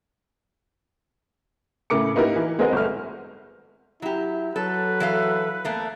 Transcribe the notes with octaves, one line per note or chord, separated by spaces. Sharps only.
A2 C#3 A#4 D6 C#7
A#3 B3 D#4 E4 G4 A#4
E3
G#3 B3 C4 A#4 D#5 F#5
G1 A3 F6
F#3 E4 G4
F#3 A4 B4
E3 A4 F5
E2 A3 A#3